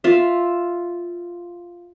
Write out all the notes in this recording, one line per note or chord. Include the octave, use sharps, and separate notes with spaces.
F4 E5